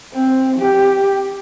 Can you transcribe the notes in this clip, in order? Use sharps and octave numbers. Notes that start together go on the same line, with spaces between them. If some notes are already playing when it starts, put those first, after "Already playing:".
C4
G4